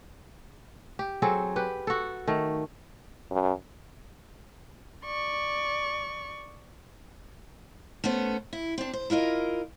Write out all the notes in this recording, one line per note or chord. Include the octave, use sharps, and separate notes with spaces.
G4
F#3 C4 G#4 A4
G4 B4
F#4 A4
D#3 A3
F#2
D5 C#6
A3 B3 C#4 C5
E4
C4 D4
C5
E4 F4 A#4 D#5